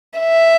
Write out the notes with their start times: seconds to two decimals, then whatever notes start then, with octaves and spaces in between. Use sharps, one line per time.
0.20 E5